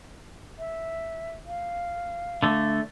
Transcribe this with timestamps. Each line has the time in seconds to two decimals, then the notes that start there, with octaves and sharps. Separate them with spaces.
0.58 E5
1.46 F5
2.43 D3 A3